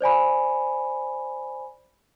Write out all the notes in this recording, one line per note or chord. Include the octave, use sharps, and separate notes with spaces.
C5 D5 G#5 B5